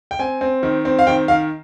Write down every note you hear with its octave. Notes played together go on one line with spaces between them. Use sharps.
G5
C4 G#5
C4
D#3
C4
F5
D#3 G5
D#3 F5